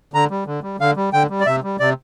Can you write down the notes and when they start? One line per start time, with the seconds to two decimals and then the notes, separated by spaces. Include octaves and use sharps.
0.14 D3 A#5
0.31 G3
0.47 D3
0.63 G3
0.80 D3 F5
0.96 G3
1.13 D3 G5
1.30 G3
1.40 D5
1.46 C3 E5
1.63 G3
1.80 C3 D5